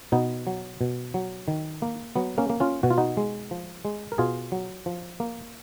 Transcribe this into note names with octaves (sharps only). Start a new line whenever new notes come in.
B2 B3 D#4
F#3
B2
F#3
D#3
A#3
F#3 B3
A#3 C#4
A#3
C#4 F4
B2 F#4
F4
D#4 F#4
G#3
F3
G#3
A#4
B2 F4 G#4
F#3
F3
A#3